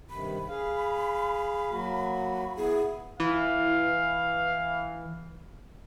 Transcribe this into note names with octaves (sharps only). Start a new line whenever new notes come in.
G2 C3 D#3 B5
G#4 F5
F#3 A#3 F#4
B3 E4 G#4
E3 F5